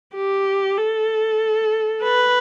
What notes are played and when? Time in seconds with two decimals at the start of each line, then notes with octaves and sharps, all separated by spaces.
0.15 G4
0.77 A4
2.04 B4